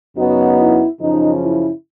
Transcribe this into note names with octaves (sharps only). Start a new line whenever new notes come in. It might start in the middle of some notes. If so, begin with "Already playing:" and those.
F#2 C#3 F#3 B3 D#4 F#4
E4
F#2 C#3 F3 D#4
E4